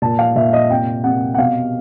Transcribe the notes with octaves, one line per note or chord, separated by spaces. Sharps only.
A#2 A5
F5
A#2 E5
D#5
C3 G5
C3 F#5
F#5
B2 F5